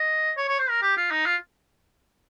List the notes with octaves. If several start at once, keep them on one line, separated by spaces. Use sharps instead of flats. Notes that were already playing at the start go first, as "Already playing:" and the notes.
Already playing: D#5
C#5
C#5
C5
A#4
G4
F4
D#4
F4